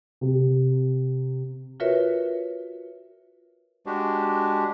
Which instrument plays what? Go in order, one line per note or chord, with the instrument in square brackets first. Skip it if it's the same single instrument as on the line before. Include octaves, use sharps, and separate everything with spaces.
[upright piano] C3
[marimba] F4 F#4 A#4 B4 C#5 E5
[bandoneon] G#3 D4 F#4 G4